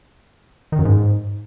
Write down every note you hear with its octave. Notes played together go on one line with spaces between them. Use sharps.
D#3
F#2
G#2